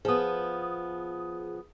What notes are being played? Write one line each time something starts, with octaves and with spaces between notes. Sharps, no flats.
F3 B3 G#4 D#6